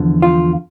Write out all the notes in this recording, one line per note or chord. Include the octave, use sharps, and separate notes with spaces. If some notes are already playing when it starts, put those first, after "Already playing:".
Already playing: E2 D3 F3
F4